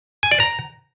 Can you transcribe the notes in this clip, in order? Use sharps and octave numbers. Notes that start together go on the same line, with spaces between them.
G#5
D5
A#5